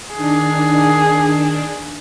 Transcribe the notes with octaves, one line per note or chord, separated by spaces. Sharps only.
D#3 D4 G#4